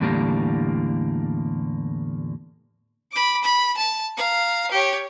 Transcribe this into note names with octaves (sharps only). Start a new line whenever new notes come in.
E2 A2 D3 G3 A#3
B5 D6
B5
A5
F5 A#5
G4 C#5